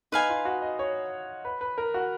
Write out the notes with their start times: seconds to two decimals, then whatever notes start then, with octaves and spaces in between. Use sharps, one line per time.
0.12 D#4 B4 F5 G#5
0.29 F4
0.45 F#4
0.62 D#5
0.79 C#5
1.45 B4
1.61 B4
1.78 A#4
1.94 F#4